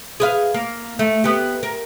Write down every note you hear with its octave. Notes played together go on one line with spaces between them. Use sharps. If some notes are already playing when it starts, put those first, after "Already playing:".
G#4 B4 F5
A#3
A3
B3 G4
A#4